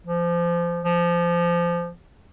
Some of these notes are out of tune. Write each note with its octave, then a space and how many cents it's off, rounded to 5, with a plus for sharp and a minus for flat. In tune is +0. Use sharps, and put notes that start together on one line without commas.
F3 -25
F3 -20